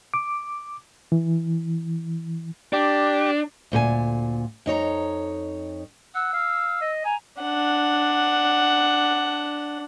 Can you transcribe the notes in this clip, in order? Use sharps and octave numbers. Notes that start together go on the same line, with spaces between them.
D6
E3
D4 G4
D2 A#2 A4 G#5
F2 D#4 C#5 A#5
F#5 E6
F5
D#5
G#5 A#5
D4 F#5